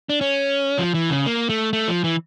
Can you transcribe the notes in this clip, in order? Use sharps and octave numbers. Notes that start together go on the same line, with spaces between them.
D4
C#4
F3
E3
C#3
A#3
A3
A3
F3
E3